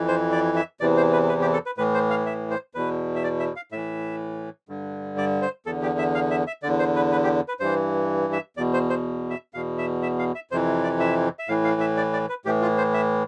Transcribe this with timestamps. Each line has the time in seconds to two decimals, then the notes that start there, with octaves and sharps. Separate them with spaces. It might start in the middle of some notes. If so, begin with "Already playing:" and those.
Already playing: F2 E3
0.08 C5
0.32 D5
0.56 E5
0.80 E2 C3 E3 D5
0.97 C5
1.13 B4
1.29 B4
1.42 G4
1.53 A4
1.66 B4
1.78 A2 E3 B4
1.94 C5
2.10 F5
2.26 E5
2.51 C5
2.75 E2 B2 B4
3.16 E5
3.24 D5
3.39 E5
3.56 F5
3.72 A2 E3 E5
4.69 G2 D3
5.18 D5
5.42 C5
5.66 E2 D3 A4
5.82 G4
5.99 E5
6.15 F5
6.31 E5
6.47 E5
6.63 E2 D3 D5
6.79 C5
6.96 B4
7.12 B4
7.24 G4
7.48 B4
7.60 G2 E3 C5
8.33 E5
8.57 E2 B2 D5
8.74 C5
8.90 C5
9.30 E5
9.54 E2 B2 F5
9.78 E5
10.03 E5
10.19 F5
10.35 E5
10.51 F2 C3 E3 C5
10.84 D5
11.00 E5
11.39 E5
11.48 A2 E3 F5
11.65 F5
11.81 E5
11.97 D5
12.13 D5
12.29 B4
12.45 A2 E3 G4
12.62 F4
12.78 C5
12.94 E5